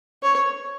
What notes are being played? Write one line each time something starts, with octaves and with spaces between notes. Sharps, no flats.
C#5